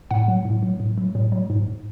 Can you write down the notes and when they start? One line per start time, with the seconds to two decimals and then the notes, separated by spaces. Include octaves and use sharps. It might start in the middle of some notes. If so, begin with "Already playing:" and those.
0.11 A2 F#5
0.28 F#3
0.45 A2
0.63 F#3
0.80 A2
0.98 F#3
1.15 A2
1.32 F#3
1.50 G#2